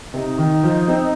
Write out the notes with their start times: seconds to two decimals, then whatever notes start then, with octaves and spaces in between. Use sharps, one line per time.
0.14 C3 D#4
0.38 D#3
0.63 F3
0.88 C4